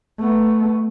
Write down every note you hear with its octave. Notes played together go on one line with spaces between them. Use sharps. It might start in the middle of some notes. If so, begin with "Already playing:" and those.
A3 B3